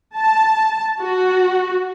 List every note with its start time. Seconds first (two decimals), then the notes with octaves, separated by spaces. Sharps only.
0.17 A5
1.01 F#4